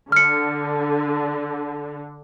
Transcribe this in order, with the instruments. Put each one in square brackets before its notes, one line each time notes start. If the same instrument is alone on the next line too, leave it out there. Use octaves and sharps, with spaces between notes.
[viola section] D3 [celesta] F6 C#7